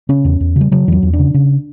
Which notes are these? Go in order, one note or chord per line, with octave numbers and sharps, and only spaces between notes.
C#3 C#4
E2
E2
C#3 G3
C#3 F#3
E2 E3 F#3
E2
D4
C#3
C#3